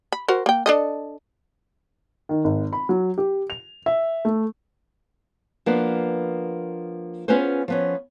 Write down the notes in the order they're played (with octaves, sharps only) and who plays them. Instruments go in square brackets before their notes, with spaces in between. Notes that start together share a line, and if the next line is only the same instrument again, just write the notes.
[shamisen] B5
F#4 A#4 C5
A#3 G5
D4 A4 D#5
[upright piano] D#3
G#1
B5
F#3
G4
F7
E5
A3
[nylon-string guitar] F3 A#3 B3 D4
B3 C#4 F4 G#4 B4 C5
F3 B3 C#4